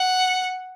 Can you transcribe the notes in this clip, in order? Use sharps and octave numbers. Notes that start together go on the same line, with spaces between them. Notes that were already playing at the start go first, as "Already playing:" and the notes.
Already playing: F#5